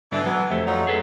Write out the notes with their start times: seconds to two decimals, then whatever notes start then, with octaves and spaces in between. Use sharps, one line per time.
0.12 G2 B2 D3 E3 D4
0.26 F#3 B3
0.51 F2 C3 A3
0.67 F#3 G3 D#4 F4
0.87 G#4 A4 B4